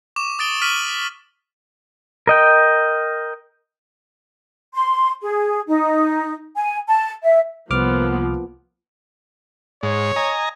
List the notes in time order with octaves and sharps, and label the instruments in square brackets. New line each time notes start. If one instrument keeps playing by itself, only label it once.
[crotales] C#6 D6 E7
D#6 A6 D7 G7
D6 F6 B6 D#7 F#7
[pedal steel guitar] A#4 D#5 G5
[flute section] C6
G#4
D#4
G#5
A5
E5
[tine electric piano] C2 D6 F6 [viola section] F3 A#3 B3
[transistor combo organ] G#2 [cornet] C#5
[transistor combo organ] D#5 G#5 A#5